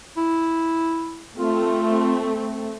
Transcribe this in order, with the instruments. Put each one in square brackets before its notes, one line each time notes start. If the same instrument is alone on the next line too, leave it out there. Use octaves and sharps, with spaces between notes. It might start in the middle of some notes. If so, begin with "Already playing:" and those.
[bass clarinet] E4
[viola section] A3 C4 [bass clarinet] F4